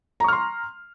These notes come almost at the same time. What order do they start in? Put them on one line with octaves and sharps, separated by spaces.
A#5 C#6 F6 C6